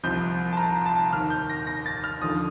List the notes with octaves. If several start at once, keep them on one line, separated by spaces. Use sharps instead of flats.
C2 C3 F3 G6
A5
A#5
A5
D#2 D#3 F6
G6
A#6
A#6
A6
F6
D#2 D3 F3 D#6